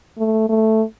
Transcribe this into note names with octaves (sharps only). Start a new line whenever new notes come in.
A3
A3